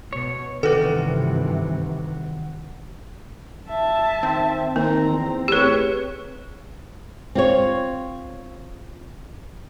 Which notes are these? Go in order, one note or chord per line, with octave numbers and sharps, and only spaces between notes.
B2 C#5
G2 C3 D#3 E3 F#4 A4 B4 D5
E5 A5
D#3 C4
D#3 A#3 A#5
E2
A2 G4 G#4 B4 C#5
C4 F4 C#5